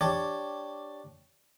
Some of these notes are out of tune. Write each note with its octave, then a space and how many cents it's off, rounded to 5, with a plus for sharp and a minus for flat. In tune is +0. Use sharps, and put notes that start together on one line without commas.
D4 +0 G4 +0 C#5 +0